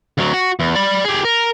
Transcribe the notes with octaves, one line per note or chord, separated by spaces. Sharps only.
D2 F#3
F#4
E2
D5 B5
G4 G#4
A#4